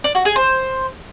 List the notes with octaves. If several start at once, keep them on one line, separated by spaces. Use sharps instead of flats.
D5
F#4
G#4
C5